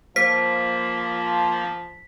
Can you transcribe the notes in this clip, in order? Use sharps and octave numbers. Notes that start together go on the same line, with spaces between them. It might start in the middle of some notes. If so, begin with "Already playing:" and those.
F3 A#3 C5 B6